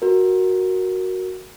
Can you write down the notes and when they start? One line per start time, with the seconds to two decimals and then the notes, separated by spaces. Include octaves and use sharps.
0.02 F#4 A#4